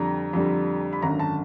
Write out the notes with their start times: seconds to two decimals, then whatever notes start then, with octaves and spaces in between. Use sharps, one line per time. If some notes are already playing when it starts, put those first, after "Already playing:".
Already playing: F2 D3 G3 A#5
0.33 F2 D3 G3
0.93 B5
1.02 G#1 F#2 D3 A#5
1.19 A5